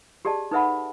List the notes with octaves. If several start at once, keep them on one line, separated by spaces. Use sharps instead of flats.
G4 G#4 D5 D#5 A5
D#4 A4 B4 E5 F#5 B5